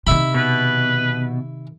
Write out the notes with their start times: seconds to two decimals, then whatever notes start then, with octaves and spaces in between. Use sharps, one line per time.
0.07 C3 D#3 E4 B5
0.34 B2 B4